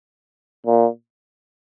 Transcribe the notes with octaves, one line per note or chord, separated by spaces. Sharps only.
A#2